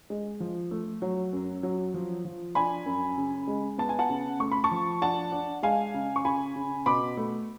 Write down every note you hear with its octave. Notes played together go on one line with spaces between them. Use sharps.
G#3
F3
A3
F#3
F#2
F#3
F3
F3
D4 G#5 B5
F#2
C#3
G#3
B3 A5
G#5
F#5 A5
C#3
A3 C#6
B5
A5 C#6
F3
D4 F#5 A5
D4
G#3 F5 G#5
C#3
C#6
C#3 G#5 B5
C#3
B2 B5 D6
A3